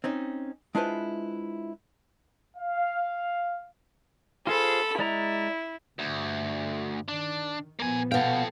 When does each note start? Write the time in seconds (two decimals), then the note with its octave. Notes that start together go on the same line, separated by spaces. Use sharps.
0.04 C4 C#4 D#4
0.75 G#3 D4 E4 F4 B4 C5
2.57 F5
4.47 F4 G#4 A4 C5 B5
4.99 G#3 E4 D5 A#5
5.99 D2 G2 D3
7.08 D#3 D4
7.79 A#2 F3 A#3 B3 G#5
8.12 B2 A4 F5 G5